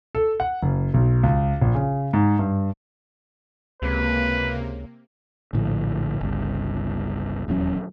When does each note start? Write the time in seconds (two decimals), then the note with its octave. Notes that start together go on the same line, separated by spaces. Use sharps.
0.15 A4
0.40 F#5
0.63 F#1
0.94 B1
1.23 C#2
1.61 A#1
1.75 C#3
2.13 G#2
2.39 G2
3.82 C#2 C3 A#3 B4
5.53 A#1 A2 D3 F3
6.21 G1 C#2
7.48 D#1 E2 F#3 C#4